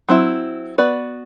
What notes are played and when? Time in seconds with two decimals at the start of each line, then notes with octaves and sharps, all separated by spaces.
0.09 F#3 C4 E4
0.78 B3 F#4 B4 D5